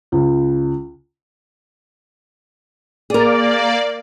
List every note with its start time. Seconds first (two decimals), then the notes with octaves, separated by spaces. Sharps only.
0.12 C#2
3.10 A#3 G#4 A#4 D5